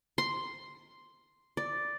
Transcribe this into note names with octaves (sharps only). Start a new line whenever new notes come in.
C6
D5